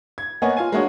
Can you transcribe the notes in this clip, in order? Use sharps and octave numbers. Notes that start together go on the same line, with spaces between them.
G#6
A#3 B3 C#5 D#5 F#5 G#5
F4 F5 G#5
G#3 A#3 D4 F#4 C#5 D#5